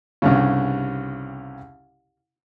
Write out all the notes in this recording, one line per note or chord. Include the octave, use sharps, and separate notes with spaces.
C2 G2 C#3